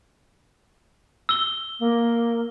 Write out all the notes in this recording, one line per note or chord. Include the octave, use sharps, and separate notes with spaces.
E6 G7
A#3